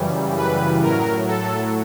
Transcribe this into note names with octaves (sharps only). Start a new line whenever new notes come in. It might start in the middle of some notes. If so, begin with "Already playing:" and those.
Already playing: F#2 C#3 E3 G3
B4
A2 F#3 A#4
A4